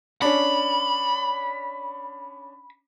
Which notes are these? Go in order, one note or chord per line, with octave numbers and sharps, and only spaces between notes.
C#4 D4 B5